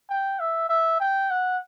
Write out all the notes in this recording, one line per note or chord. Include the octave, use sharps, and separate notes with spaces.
G5
E5
E5
G5
F#5